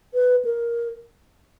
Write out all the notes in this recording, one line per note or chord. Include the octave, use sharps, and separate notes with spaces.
B4
A#4